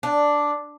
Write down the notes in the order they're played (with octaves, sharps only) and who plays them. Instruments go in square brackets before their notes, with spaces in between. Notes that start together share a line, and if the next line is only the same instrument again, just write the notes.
[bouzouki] D4